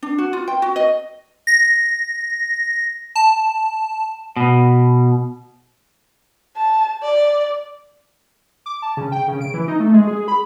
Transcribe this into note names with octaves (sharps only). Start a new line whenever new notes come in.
D4
F#4
F4
G5
F#4
D#5
A#6
A5
B2
A5
D5
D6
A5
C#3
G5
C#3
D7
E3
D#4
A3
G#3
G#4
B5